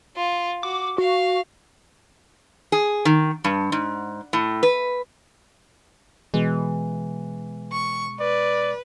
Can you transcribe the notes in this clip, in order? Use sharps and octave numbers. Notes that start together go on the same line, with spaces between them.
F4
F#4 D6
F#4 F5
G#4
D#3
G2
G#2
A2
B4
B2 E3 G#3
C#6
B4 D5